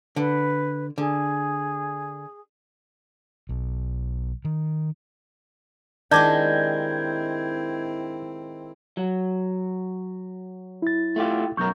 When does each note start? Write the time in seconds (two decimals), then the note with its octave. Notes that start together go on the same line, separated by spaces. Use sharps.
0.16 D3 B4
0.98 D3 G#4
3.49 B1
4.45 D#3
6.11 D#3 G#3 C4 D4 E4 G4 G6 G#6
8.97 F#3
10.82 E4 A6
11.16 A3 F4 G4
11.57 B1 F#2 A#4 C#6 G6